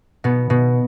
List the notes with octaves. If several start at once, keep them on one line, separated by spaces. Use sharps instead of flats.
B2 B3
B2